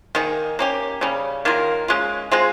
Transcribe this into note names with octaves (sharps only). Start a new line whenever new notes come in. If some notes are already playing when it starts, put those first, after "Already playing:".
D#3 A#3 D#4 G#4
A#3 C#4 G4
C#3 G3 C#4
D#3 A#3 F4 A#4
G#3 C#4 F4
G#3 C4 F4 G#4